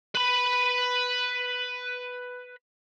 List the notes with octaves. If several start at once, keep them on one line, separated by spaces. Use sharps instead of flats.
B4 B5